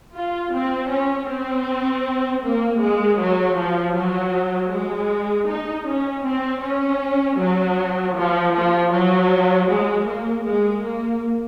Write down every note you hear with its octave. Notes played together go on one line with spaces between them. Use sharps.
F4
C4
C#4
C4
A#3
G#3
F#3
F3
F#3
G#3
D#4
C#4
C4
C#4
F#3
F3
F3
F#3
G#3
A#3
G#3
A#3